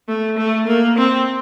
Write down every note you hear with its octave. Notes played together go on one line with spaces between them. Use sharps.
A3
A3
A#3
C4